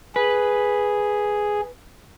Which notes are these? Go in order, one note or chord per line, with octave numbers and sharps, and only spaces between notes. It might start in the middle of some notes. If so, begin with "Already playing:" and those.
G#4 B4